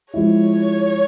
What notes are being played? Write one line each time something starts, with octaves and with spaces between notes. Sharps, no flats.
F3 G#3 E4 C#5